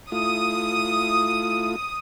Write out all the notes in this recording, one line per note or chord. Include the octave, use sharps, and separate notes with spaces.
A3 E4 F4 D#6